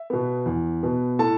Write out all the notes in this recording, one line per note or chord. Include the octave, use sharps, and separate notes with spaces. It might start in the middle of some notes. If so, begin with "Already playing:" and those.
Already playing: E5
B2 B3
E2
B2 B3
A2 A4 A5